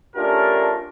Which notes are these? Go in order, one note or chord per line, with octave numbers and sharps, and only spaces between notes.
A3 C#4 D4 F4 G4 A#4